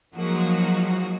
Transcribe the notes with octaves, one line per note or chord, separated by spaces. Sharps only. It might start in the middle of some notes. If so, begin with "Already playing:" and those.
F3 F#3 G#3 A#3 D#4 F#4